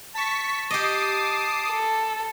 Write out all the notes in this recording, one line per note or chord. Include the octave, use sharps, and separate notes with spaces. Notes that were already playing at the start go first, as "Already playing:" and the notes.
A5 C#6 B6
G4 D#5 D6 D#6 C7
A4